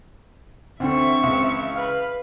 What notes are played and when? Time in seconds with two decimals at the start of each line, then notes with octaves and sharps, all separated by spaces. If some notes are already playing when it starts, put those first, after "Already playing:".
0.80 D2 D3 E3 C4 E5 C#6
1.23 C#2
1.76 B4 F5